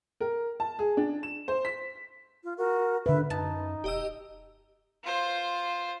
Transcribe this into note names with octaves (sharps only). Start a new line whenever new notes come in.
A#4
A5
G#4
D4
E7
C5
B6
F4
F#4 A#4
D3 B4 E5
F#2 D#4 A5
E1 G4 D#5 E6
F4 C5